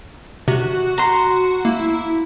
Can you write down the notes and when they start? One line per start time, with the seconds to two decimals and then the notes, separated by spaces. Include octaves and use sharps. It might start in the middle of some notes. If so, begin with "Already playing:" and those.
0.48 C3 F#4
0.98 A#5 C6
1.65 A#3 E4